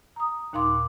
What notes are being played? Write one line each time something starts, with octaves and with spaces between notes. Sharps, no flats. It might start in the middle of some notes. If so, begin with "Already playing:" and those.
A#5 D#6
D#2 A#2 D#4 F5 C6 D6